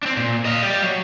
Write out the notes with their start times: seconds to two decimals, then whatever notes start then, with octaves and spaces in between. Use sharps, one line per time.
0.03 C4 D4
0.17 A#2
0.45 D#5 F5
0.63 G4 D5
0.82 F#3